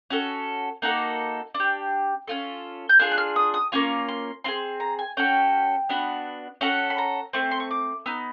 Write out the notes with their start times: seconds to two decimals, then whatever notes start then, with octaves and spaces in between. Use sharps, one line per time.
0.10 C#4 F#4 A4
0.82 A#3 D#4 F#4 A4
1.54 D4
1.60 G4
2.28 C#4 F4 A4
2.89 G6
2.99 D4 F4 G#4 F#6
3.12 F#6
3.18 F6
3.36 D#6
3.54 D#6
3.72 A#3 C#4 F4 C#6
4.08 C6
4.44 C4 F4 G#4 C6
4.80 A#5
4.99 G#5
5.17 C#4 F#4 A4 G5
5.89 B3 D4 F#4
6.61 C#4 F#4 A4 F#5
6.90 B5
6.98 A#5
7.33 A3 C4 C#6
7.51 C6
7.60 C#6
7.71 D6
8.06 B3 D#4 E6